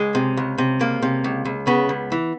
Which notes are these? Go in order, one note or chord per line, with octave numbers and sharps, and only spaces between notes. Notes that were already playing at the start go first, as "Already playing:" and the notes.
Already playing: C#2 G#3
C3
C#2
C3
C#2 A#3
C3
C#2
C#2
C#3 B3
C#2
E3